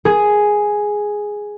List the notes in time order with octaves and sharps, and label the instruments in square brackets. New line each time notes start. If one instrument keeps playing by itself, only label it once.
[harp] G#4